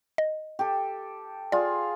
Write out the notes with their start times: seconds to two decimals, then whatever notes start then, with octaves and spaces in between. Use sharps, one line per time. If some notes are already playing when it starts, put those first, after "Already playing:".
0.18 D#5
0.59 G4 A4
1.52 F4 G#4 D5